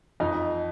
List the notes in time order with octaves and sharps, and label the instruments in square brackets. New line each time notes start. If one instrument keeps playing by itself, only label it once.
[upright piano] F2 D#4